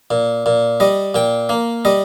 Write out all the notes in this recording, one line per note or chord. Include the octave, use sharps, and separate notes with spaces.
A#2
A#2
G3 D#5
A#2 G5
A#3
G3 D#5